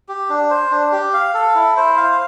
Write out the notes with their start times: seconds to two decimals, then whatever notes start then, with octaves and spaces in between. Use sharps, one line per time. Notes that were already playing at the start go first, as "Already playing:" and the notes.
0.09 G4
0.29 D4
0.50 C5
0.71 D4
0.92 G4
1.13 F5
1.34 A4
1.55 E4
1.77 C5
1.97 F5